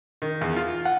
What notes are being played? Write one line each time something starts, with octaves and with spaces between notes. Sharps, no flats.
D#3
E2
F4
F#5